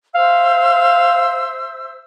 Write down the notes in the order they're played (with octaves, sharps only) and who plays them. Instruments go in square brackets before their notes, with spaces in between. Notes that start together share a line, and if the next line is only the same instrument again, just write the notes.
[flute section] C5 E5 E6 [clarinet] F5